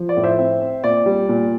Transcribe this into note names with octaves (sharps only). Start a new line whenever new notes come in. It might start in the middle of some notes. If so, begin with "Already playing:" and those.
Already playing: F3
D5
A2
C5 E5
C4
C4
A#2 D5
G3
A#2